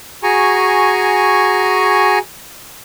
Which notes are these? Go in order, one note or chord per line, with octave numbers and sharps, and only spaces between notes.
F#4 G#4 G#5 A#5 C#6